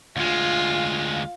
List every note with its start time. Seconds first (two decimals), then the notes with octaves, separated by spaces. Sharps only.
0.17 D2 G#3 F4 F5